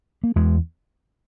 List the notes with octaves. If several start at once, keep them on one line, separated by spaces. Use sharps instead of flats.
A#3
E2 G#3